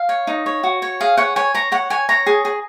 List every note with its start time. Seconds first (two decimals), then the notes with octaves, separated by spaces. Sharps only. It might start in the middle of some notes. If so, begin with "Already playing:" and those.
Already playing: F5
0.09 C#5
0.27 D#4
0.46 C#5
0.63 F#4
0.82 C#5
1.00 G#4 F5
1.17 C#5 F#5
1.36 C#5 G#5
1.54 C#5 A#5
1.72 C#5 F#5
1.90 C#5 G#5
2.09 C#5 A#5
2.26 G#4
2.45 G#4